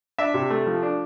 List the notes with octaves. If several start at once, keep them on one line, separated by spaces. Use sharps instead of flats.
D4 E5
C3
A3
F3
D4